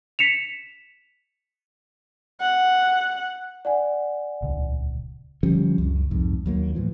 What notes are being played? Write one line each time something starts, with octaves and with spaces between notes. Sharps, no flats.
B6 C#7 E7 F7
F#5
D5 F#5 G#5
D#1 C#2
D3 F3 G3 C#4
C#2 F#2
C2 F2 G#2
D#2 F#3 A#3
A2 E3 F3